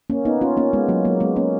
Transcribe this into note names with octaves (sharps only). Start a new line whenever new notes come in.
A#3 C#4
B3 D#4
C#4 F4
A#3 C#4
G#3 B3
F#3 A#3
F#3 A#3
G#3 B3
A#3 C#4